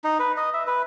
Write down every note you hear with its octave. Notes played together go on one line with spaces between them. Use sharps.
D#4
B4
D#5
E5
B4